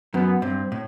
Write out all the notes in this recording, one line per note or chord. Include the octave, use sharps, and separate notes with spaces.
F#2 B3
G2 C4
A2